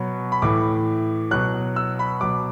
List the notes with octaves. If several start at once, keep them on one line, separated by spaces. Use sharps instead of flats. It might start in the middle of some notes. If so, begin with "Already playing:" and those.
Already playing: B2 F#3 B5
B5
A2 E3 D6
B2 F#3 F#6
E6
B5
B2 F#3 D6